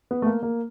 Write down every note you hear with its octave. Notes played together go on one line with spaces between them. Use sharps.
B3
A3
A#3
A#3